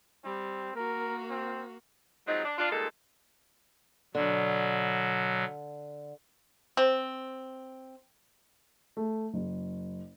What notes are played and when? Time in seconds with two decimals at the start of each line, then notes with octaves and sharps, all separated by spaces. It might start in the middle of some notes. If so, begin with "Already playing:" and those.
0.24 G3 C4
0.76 A#3 F#4 A#4
1.30 C4
2.27 F3 F#3 G#3 C4 D#4
2.45 D4
2.58 D4 F4
2.71 A#2 G3 G#3 A#3 D#4 A4
4.15 B2 D3 F#3
6.77 C4
8.97 A3
9.34 F#1